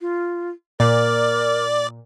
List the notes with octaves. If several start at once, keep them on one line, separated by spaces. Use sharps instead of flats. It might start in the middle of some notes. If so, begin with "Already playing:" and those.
F4
A#2 A#4 D5